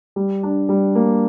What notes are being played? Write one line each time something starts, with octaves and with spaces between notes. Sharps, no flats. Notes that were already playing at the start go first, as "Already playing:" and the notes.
G3
D4
G3
A#3